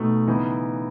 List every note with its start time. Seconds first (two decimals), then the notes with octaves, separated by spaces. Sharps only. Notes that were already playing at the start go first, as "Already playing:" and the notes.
Already playing: B2 A3 D#4
0.28 C#3 E3 B3 D#4